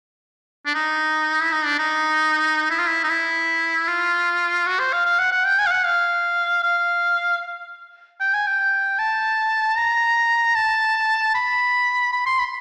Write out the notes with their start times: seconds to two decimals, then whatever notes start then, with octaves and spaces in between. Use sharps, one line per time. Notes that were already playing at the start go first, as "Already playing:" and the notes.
0.66 D4
0.74 D#4
1.41 E4
1.52 D#4
1.66 D4
1.79 D#4
2.70 E4
2.79 F4
2.88 E4
3.04 D#4
3.10 E4
3.88 F4
4.67 F#4
4.80 C5
4.93 F5
5.05 F5
5.19 F#5
5.32 F#5
5.45 G5
5.58 G#5
5.66 F5
5.71 F#5
5.85 F5
6.63 F5
8.20 G5
8.34 G#5
8.47 G5
8.99 A5
9.77 A#5
10.55 A5
11.35 B5
12.13 B5
12.26 C6
12.39 B5